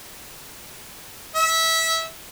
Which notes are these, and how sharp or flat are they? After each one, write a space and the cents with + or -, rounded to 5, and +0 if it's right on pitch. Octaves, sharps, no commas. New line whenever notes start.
E5 -20